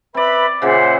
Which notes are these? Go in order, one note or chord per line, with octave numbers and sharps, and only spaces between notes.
C4 B4 D5 E5 B5
A#2 C#3 C5 E5 F#5